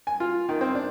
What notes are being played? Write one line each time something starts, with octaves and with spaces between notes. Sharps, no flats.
G#5
F4
D#3
C4
D4